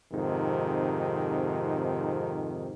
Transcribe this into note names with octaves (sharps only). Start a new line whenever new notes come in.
F2 G#2 C3 D#3